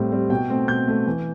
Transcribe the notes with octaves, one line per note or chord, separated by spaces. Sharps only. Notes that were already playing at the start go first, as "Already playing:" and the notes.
Already playing: A2 G3 C4
G3 C4
B2 G5
A3 C4
B2 G6
A3 C4
E3